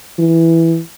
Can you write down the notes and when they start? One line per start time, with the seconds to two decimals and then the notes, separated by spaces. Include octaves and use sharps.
0.19 E3